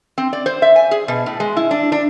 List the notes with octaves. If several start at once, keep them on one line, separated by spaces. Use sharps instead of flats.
C4
D5
C5
E5
G#5
G#4
B2
A2
G#3
E4
D4
D4